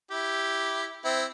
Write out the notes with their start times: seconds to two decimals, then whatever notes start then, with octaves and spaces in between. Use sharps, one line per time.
0.11 E4 G4
1.05 C4 E4